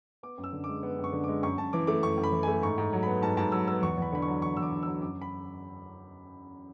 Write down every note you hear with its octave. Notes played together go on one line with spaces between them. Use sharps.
B3 D6
F#2
E6
D3
G#3 D6
B3
F#2
C#6
D3
G#3 D6
F#2 C#6
F#2 A5
E3 D6
A3 D6
F#2 C#6
F#2
B5
E3
A3 G#5
G#2 C#6
G#2
F#3
B3 B5
G#2 A5
G#2 A5
F#3 E6
B3 E6
E2 C#6
E2 B5
D3 B5
C#6
F#3
E2 C#6
E2 E6
D6
D3
F#3 E6
F#2 D6
B5